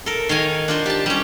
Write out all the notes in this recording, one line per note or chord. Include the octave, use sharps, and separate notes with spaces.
A4 A#4
D#3 C#5 F5 G#5
D4 F4 C5
G4 A5
G3 C#4